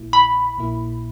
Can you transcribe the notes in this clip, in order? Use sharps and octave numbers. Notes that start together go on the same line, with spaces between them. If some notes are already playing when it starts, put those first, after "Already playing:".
Already playing: A#1 A#2 A#3 E4
B5
A#1 A#2 A#3 E4